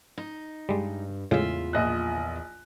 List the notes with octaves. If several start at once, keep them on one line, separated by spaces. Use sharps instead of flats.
D#4
G2 G3 G#3
E2 A2 C#3 G#3 F4 E5
A#1 D#5 F#6